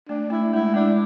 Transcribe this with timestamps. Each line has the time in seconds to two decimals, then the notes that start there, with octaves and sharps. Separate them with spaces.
0.09 A3 D4
0.30 A3 E4
0.53 G#3 E4
0.74 G#3 D4